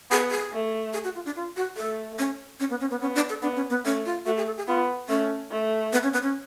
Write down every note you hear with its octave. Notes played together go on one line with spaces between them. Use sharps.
B3 G#4
G#4
A3
G#4
F#4
F4
D4
F4
F#4
A3 A4
C#4
C#4
B3
C#4
B3
B3 C#4
D4
A4
B3 D4
C#4
B3
A3 C#4
F4
A3 F#4
G#4
A4
G#4
B3 F4
A3 C#4
A3
B3
C#4
B3
C#4